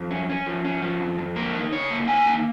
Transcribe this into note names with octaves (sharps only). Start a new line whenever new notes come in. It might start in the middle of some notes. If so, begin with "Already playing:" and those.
Already playing: F2
C#4
C#4
F3
C#4
F3
F2
F2
A#3 A#4
D#4
C#3 C#5
A#3
D#4 G#5
A#3